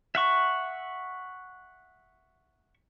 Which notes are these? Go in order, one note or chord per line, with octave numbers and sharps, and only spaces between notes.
E5 F#5 C#6